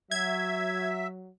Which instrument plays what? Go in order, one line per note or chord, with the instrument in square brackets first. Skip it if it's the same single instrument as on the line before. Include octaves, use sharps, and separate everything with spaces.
[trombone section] F#3 [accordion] E5 [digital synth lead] G#6